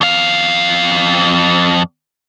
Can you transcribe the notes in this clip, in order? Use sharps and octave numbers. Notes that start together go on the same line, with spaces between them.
F2 F5